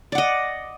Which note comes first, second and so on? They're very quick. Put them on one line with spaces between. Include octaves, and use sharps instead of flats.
D5 F#5 D#5